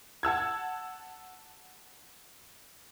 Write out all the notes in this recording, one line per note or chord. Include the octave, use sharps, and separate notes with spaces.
F#5 A5 E6 G#6